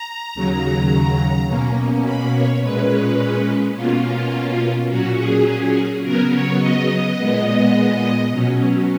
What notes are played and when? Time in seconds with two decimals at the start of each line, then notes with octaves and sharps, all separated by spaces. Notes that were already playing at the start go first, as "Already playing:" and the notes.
Already playing: A#5
0.34 D#2 C#3 F#3
1.47 B2 A#3 C#4
2.05 B5
2.33 C#5
2.61 A#2 G#3 C#4 B4
3.75 B2 A#3 C#4 F4
4.04 F4
4.89 A#2 F#3 C#4 F#4
5.17 G#4
6.03 C#3 F#3 B3 A#4
6.32 C#5
6.59 D#5
7.16 A#2 G#3 B3
8.31 B2 F#3 C#4